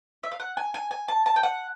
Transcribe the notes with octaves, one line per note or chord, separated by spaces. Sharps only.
E5
F5
F#5
G#5
G#5
G#5
A5
A5
G5
F#5